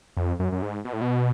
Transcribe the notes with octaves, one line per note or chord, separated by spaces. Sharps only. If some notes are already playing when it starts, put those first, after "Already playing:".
F2
F#2
F#2
G#2
B2
A2
B2